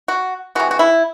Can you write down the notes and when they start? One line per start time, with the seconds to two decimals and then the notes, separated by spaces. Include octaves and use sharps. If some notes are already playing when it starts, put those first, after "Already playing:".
0.08 F#4
0.55 C3 E3 G#3 F#4
0.71 F#4
0.79 E4